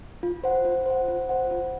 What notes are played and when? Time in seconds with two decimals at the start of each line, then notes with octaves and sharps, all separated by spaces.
0.23 F4
0.44 C5 F#5
0.65 F4
0.86 C5 F#5
1.08 F4
1.29 C5 F#5
1.51 F4